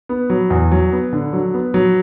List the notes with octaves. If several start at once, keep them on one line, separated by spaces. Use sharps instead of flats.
B3
F#3
E2
F#3
B3
D3
F#3
B3
F#3